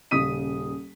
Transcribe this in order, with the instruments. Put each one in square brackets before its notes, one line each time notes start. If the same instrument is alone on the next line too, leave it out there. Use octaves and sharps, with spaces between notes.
[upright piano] D#1 C#3 D#6 B6 D#7